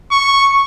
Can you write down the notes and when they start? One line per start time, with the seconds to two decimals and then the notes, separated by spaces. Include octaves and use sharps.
0.12 C#6